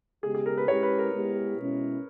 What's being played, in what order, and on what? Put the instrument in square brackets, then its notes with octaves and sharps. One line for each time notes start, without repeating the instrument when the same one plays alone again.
[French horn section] C#3 G#3 B3 G4 [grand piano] G#4
[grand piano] G#4
A#4
B4
[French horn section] G#3 C#4 E4 G4 [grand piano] C#5
[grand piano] B4
A#4
[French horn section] G#3 B3 E4 G4
B2 G#3 C#4 E4